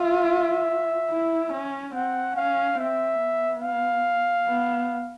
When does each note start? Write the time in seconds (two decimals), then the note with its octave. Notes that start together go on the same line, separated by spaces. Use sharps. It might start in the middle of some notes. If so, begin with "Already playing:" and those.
Already playing: F4 E5
1.10 E4
1.53 C#4
1.94 C4 F#5
2.36 C#4 F5
2.79 C4 E5
3.21 B3
3.63 F5
4.47 B3